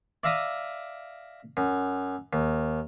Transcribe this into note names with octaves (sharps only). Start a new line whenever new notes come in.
D5 E5 F5 A#5 D6 D#6
F#2
D#2